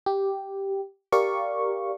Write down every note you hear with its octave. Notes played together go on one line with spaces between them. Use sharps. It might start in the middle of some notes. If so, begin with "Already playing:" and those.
G4
G4 A#4 D5 F5 C#6